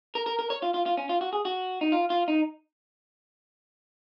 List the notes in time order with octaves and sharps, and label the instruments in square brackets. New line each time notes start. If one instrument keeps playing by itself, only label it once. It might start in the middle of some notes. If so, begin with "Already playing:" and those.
[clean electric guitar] A#4
A#4
A#4
C#5
F4
F4
F4
C#4
F4
F#4
G#4
F#4
D#4
F4
F4
D#4